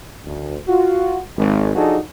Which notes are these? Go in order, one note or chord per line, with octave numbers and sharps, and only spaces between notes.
D2
F4 F#4
G#1
F3 D4 D#4 F#4 G#4 A4